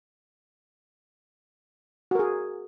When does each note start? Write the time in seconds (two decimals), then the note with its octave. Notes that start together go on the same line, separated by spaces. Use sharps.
2.11 F#4
2.15 A#4
2.19 G#4